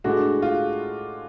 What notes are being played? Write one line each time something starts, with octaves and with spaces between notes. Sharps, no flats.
A2 G#3 D4 F#4
F4